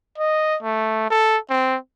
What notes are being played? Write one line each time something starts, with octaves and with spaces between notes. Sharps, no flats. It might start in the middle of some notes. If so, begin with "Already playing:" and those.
D#5
A3
A4
C4